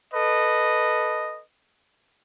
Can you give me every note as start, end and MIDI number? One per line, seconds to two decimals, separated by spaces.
0.14 1.42 69
0.14 1.42 71
0.14 1.42 75